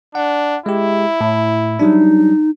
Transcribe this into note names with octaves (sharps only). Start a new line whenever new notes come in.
D4 F#5
G#3 E4 G4
A2
F#3 G3 D4 D#4